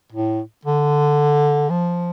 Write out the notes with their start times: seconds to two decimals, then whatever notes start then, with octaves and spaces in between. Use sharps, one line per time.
0.13 A2
0.65 D3
1.70 F3